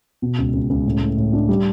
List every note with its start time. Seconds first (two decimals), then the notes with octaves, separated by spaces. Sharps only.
0.22 B2
0.38 C#2
0.54 C#2
0.70 C#2
0.86 A2
1.01 A2
1.17 A2
1.33 D4
1.49 G3